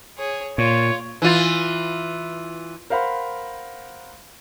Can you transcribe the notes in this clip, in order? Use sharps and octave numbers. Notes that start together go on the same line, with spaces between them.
G#4 C#5
A#2 F4 C#5
E3 F4
A#4 C5 F5 F#5 B5